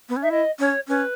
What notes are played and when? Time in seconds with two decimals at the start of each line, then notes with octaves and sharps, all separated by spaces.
0.09 B3
0.17 C#4
0.22 D#4 E5
0.30 E4 D#5
0.59 C#4 C#5
0.88 C#4 B4